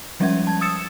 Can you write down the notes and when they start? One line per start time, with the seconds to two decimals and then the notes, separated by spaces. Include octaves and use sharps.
0.20 F3 G3 G#3 C#4 E5 G#6
0.47 A5 G#6
0.61 D#6 E6 A6 C#7 E7